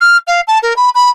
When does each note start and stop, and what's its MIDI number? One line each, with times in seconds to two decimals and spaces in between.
0.01 0.18 89
0.27 0.41 77
0.48 0.59 81
0.63 0.76 70
0.76 0.89 83
0.95 1.10 83